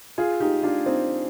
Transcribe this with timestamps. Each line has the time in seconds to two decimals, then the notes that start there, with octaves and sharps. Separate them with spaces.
0.18 F4 G#4
0.40 D#4 G4
0.63 D4 F4
0.86 C4 D#4